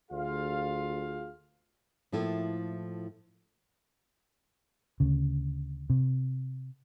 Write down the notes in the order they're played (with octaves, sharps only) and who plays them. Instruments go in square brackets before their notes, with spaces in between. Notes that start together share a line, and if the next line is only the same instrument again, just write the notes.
[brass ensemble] D2 F4 G#4 F5
[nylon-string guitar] A2 F3 A#3 E4 A4
[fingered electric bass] D2 C#3
C3